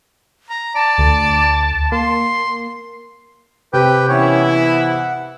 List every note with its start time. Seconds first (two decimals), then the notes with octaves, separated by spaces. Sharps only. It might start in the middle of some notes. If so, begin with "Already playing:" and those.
0.50 A#5
0.75 D5 A5
0.98 D2
1.92 A#3 C6
3.73 C3 G4 B4 G5
4.09 E3 B3 C#4 E4 C#5
4.49 F#5